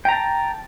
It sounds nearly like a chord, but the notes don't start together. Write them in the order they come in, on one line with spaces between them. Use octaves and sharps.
G5 A#5 A5